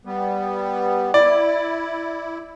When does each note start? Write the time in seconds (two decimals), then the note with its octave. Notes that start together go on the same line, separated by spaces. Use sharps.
0.05 G3 B3
1.14 E4 D5